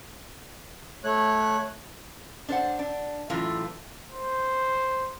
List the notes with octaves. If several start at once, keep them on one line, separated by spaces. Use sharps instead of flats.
A3 C#5 F#6
D4 C5 F#5
D4
F#2 A2 E3 A3 F4
C5